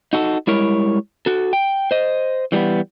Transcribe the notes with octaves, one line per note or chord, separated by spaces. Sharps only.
D#4 F#4 A4
G3 G#3 E4 A#4 C#5
F#4 A4
G5
C5 D#5
E3 G3 A3 B3